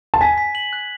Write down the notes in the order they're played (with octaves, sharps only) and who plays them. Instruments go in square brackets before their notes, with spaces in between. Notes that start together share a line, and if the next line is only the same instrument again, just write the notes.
[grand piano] A5
[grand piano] G#5 [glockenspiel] B6
[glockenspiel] B6
F#7
F#6